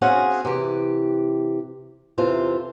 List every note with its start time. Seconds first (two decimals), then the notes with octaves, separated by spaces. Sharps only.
0.01 C4 C#4 F#4 G#4 F5 F#5
0.45 C3 E3 G4
2.18 E2 C3 E3 F4 A4 C5